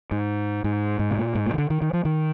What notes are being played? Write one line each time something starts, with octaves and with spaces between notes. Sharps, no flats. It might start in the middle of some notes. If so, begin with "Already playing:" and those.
G#2
G#2
G#2
C3
A#2
G#2
A#2
D#3
D3
D#3
D#3
F3
D#3